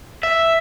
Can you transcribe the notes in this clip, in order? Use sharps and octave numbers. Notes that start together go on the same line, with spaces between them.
E5